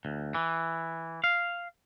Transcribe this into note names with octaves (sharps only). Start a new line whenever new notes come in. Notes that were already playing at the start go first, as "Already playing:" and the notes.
D2
E3
F5